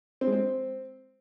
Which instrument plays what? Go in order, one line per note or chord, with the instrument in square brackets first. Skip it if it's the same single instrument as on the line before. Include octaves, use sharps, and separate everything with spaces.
[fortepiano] C4
G#3
C4